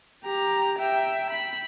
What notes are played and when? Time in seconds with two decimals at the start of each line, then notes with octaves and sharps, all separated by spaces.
0.24 G4 A#5
0.79 E5 G5
1.30 B5